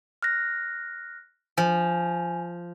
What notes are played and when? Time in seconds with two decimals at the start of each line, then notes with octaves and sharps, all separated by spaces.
0.23 F6 F#6 A#6
1.57 F3 G#5